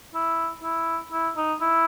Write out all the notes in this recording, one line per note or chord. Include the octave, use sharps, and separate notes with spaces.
E4
E4
E4
D#4
E4